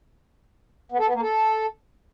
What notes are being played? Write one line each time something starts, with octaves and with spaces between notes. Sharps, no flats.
B3
A4
B3
A#3
A4